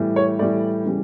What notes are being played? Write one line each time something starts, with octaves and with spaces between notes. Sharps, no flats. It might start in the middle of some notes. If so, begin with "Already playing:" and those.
Already playing: A2 E3 G3
C#5
A2 E3 G3 D5
C#3 E3 G3